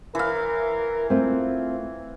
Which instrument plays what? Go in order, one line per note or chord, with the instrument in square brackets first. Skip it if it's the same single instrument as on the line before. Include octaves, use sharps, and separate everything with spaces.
[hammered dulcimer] E3 F5 [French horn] A#4
[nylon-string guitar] A3 C4 [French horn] F4